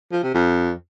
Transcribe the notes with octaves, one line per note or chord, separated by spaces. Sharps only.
F3
C3
F2